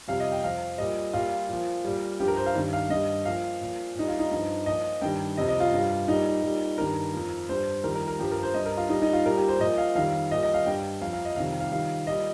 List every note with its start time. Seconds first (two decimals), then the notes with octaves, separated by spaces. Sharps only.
0.08 F2 C3 G3 F5
0.20 D#5
0.32 G5
0.43 F2 F3 F5
0.78 A#2 G3 D#5
1.14 A#2 G3 F4
1.48 A#2 F3
1.85 A#2 G3
2.20 G2 F3 G4
2.28 A#4
2.37 C5
2.46 F5
2.55 G2 D#3 G3
2.73 F5
2.90 G2 G3 D#5
3.25 A#2 F3 F5
3.61 A#2 F3
3.95 A#2 G3 D#4
4.08 F4
4.19 D#4
4.32 G2 F3
4.66 A#2 F3 D#5
5.02 G2 D#3 G3 G5
5.37 F2 C3 G3 D#5
5.48 D#5
5.60 F4
5.72 G2 G3
6.08 A#2 G3 D#4
6.43 A#2 G3
6.78 G2 D#3 G3 A#4
7.13 F2 F3
7.49 G2 G3 C5
7.84 F2 D#3 G3 A#4
7.95 A#4
8.08 A#4
8.19 G2 F3 G4
8.32 A#4
8.43 C5
8.54 G2 G3 D#5
8.66 A#4
8.77 F4
8.89 A#2 G3 D#4
9.02 D#4
9.13 F4
9.26 A#2 G3 A#4
9.37 G4
9.48 C5
9.60 A#2 F3 D#5
9.78 F5
9.95 F2 D#3 G3 F5
10.31 A#2 G3 D#5
10.43 D#5
10.54 F5
10.66 G2 G3 G5
11.01 F2 F5
11.06 F3
11.13 F5
11.25 D#5
11.36 F2 C3 D#3 G3 F5
11.60 F5
11.72 F2 D#3 G3 F5
12.07 A#2 G3 D#5